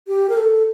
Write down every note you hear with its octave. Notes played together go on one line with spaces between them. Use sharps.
G4
A#4
A4